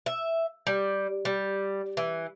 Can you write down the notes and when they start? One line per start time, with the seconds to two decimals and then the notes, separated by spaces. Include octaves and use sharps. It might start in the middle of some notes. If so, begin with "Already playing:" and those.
0.06 E5
0.67 G3
1.25 G3
1.97 E3